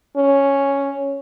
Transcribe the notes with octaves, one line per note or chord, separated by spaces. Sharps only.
C#4